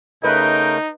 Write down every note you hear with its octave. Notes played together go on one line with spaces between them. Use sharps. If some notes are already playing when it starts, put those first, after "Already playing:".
C#3 A3 D#4 A#4 B4 D#5 G5